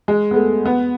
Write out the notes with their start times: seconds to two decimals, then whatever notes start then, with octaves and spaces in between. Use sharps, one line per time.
0.08 G#3
0.31 B3
0.36 A3
0.66 B3